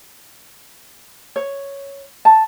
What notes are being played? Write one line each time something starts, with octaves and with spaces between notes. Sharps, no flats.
C#5
A5